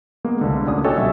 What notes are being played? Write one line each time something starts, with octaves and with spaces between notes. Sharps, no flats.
G#3 A#3 B3
C2 D3
D2 A#2 C#4 D5 D#6
F#4 A4 C#5 D#5 G5 G#5
B1 G3 E5